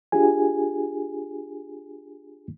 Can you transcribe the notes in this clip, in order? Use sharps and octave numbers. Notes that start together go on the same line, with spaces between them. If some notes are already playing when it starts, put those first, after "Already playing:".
D4 F4 G4 G#4 G#5